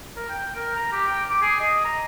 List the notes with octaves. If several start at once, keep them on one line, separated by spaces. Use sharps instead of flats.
A#4
G5
A#4
A#5
G4
G5
D6
G#4
D#5
A#5